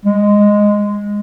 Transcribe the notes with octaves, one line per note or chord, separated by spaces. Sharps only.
G#3